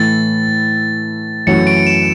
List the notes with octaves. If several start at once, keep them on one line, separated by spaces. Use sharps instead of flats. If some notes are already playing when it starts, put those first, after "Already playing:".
Already playing: A2 E3 A3 A6
F#2 E3 A3 C#4 F#4 C#7
D7
E7